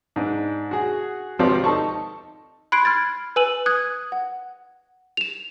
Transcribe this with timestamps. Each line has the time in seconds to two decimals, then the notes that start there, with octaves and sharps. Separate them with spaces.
0.16 G#2 D4
0.71 F#4 G#4
1.39 G#1 C3 F3 B3 G4 D5
1.64 D#4 A4 A5 C#6
2.72 B5 C6 F#6 G#6 C7 D7
2.85 B5 F6 G#6 A6
3.36 B4 G#5 E6 D#7 F#7
3.66 D#6 F#6 G#6
4.12 F#5
5.17 E7 F7